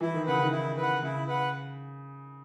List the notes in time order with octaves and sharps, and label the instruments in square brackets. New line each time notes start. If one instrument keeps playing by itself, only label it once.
[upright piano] E3 [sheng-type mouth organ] E4
[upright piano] D#3
[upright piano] C#3 [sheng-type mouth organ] B4 F#5
[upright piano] D#3
[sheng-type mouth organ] E4
B4
F#5
[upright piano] C#3 [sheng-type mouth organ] E4
[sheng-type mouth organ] B4 F#5